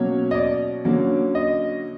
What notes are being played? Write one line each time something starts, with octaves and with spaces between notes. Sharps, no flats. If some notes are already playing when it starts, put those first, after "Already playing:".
Already playing: B2 F#3 A#3 C#4 C#5
D#5
D5
D3 F#3 A#3 C#4
D#5